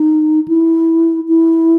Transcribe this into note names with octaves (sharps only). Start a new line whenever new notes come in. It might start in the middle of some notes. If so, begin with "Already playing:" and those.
Already playing: D#4
E4
E4